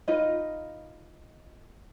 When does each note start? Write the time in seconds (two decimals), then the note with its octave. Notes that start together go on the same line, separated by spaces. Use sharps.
0.08 D#4 F4 B4 D#5